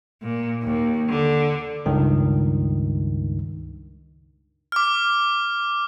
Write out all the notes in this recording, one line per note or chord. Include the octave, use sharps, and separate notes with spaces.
A#2
D#2
D3
C#2 G2 D#3
D6 F6